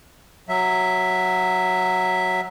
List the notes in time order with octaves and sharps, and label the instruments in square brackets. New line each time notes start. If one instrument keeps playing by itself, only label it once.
[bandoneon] F#3 E5